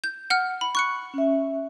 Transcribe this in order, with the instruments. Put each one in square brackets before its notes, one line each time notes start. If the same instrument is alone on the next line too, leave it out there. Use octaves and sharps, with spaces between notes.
[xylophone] G6
F#5 F6
B5
C#6 F#6 C#7
[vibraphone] C#4 E5